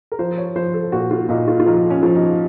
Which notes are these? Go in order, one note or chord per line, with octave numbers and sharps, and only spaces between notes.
A#4
F3 C5
C#5
F3 C5
A4
A#2 F#4
F4
A#2 D#4
F4
F4
F3 D#4
C#4
F3
D#4